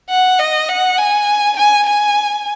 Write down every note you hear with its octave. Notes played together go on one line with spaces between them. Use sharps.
F#5
D#5
F#5
G#5
G#5
G#5